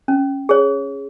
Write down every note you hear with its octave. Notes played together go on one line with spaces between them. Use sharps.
C#4
G#4 C#5